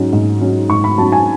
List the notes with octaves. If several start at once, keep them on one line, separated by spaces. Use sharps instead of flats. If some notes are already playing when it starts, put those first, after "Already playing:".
Already playing: G#2 F#3 C#4
G#2
F#3 C#4
G#2 C#6
B5
F#3 C#4 A5
G#5